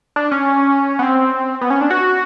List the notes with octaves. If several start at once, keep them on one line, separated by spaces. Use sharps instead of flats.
D4
C#4
B3
C4
B3
C#4
D4
F#4